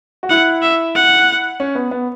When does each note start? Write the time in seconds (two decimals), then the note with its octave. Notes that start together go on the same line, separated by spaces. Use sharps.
0.23 F#4
0.30 E4 F#5
0.62 E5
0.95 F#5
1.60 C#4
1.75 B3
1.91 B3